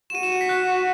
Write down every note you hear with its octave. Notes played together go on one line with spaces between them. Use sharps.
E7
F#4 D#7
E7
D#7
B6
F#6